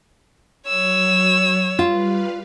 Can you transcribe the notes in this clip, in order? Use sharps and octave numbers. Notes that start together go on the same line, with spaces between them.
F#3 C#5 E6
G3 F4 B4 F5